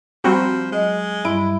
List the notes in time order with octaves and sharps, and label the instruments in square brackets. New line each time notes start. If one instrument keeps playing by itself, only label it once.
[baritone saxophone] F3 [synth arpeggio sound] G3 C4 F#4 [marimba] A#5 B5
[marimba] F#3 D#5 [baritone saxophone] G#3
[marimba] G2 G3 C6 [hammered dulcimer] E4 [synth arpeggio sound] D7